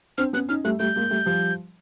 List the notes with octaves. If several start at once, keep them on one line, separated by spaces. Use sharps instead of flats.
C4 D4 F6
B3 C#4 F#6
C#4 D#4 F6
G3 A3 F#6
G3 A3 G6
G#3 A#3
G3 A3
F3 G3